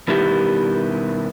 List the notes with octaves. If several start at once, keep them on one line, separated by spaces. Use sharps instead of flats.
B2 D#3 G3 B3 E4 G4